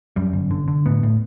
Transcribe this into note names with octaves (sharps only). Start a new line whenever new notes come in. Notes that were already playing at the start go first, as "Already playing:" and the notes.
F#2 G3
G1
D3
D3
A2 B3
A2